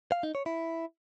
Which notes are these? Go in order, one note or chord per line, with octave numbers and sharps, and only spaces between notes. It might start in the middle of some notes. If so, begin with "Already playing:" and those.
F5
D#4
C#5
E4